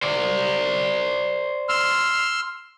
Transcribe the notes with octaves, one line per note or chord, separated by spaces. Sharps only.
C5 D5
C6 E6 F6